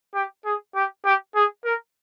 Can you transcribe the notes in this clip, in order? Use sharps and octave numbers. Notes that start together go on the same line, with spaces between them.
G4
G#4
G4
G4
G#4
A#4